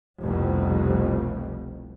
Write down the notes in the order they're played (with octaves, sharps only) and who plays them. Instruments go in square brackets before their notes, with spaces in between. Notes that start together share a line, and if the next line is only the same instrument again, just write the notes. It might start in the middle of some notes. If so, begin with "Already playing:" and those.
[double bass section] F1 C2 F2 B2